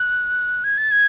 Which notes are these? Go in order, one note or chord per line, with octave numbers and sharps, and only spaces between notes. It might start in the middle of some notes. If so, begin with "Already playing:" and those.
Already playing: F#6
G#6
A6
G#6